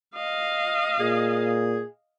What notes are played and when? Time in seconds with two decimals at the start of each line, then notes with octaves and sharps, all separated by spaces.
0.15 D#5 F5
1.00 A#2 G#4